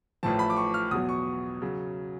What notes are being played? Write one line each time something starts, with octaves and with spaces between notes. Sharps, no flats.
A1 A2 F3 A5
B5
D6
C#6
F6
E2 B2 F#3 D#6
C#6
C#3 F#3